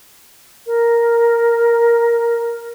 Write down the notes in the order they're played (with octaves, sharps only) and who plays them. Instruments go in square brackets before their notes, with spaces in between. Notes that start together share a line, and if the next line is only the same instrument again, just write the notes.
[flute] A#4